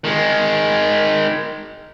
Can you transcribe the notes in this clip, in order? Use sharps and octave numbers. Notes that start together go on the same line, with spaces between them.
D#3 G#3